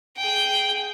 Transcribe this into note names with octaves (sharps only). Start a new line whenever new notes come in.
G#4 G5